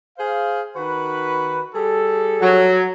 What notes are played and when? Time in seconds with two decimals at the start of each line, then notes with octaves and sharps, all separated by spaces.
0.18 G#4 C5 F5
0.76 D#3 F#4 B4
1.75 G3 G#4 A4
2.42 F#3